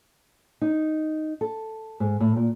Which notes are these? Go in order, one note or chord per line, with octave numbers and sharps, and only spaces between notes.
D#4
A4
G#2
A2
A#2